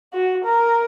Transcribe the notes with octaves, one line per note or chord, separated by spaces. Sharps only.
F#4
A#4